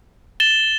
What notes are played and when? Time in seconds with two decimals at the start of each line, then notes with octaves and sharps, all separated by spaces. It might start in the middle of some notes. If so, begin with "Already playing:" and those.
0.40 A6 E7 G7